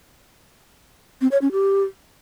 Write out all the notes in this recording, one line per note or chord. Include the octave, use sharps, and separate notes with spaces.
C4
C#5
C#4
G4